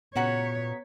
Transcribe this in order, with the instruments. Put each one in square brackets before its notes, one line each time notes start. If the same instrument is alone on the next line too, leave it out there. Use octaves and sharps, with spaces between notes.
[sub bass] A#2 [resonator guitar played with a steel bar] C#3 F#4 F#5 [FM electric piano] B3 A#5 B6 [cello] C#5